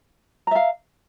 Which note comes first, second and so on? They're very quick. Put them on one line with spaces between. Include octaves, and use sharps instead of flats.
A#5 E5 F5